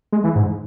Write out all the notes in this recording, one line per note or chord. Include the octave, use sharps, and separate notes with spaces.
G#3
E3
G#2